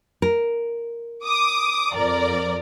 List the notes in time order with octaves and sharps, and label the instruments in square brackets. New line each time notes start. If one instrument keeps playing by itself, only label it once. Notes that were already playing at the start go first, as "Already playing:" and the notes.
[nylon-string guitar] A#4
[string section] D6 D#6
F2 A#4 D5